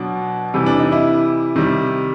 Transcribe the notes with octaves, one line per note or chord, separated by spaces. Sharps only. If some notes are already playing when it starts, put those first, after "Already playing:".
Already playing: B2 F#3 D4
C3 E3 G3
D4
D#4
E4
C3 D#3 G3